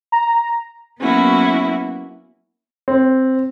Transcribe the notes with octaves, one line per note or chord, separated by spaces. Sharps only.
A#5
F#3 A#3 B3 C#4 E4 F#4
C4